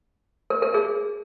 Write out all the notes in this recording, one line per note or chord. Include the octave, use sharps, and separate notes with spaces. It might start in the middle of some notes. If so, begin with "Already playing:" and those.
A#4
A#4
G#4